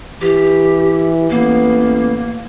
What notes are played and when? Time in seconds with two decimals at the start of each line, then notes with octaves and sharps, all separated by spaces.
0.21 E3 G4
1.30 A1 A#3 B3